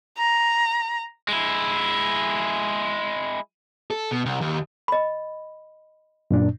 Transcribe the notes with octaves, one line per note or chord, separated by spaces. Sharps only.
A#5
G#3 E4
A4
B2
C2
D#2
D#5 B5
F#2 A#2 D4